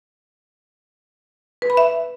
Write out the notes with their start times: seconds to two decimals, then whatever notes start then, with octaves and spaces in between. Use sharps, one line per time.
1.62 B4
1.70 B5
1.77 E5